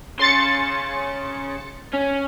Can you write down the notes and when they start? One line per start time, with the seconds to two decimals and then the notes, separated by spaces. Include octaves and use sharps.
0.19 C#3 C6 A6 C#7
1.93 C#4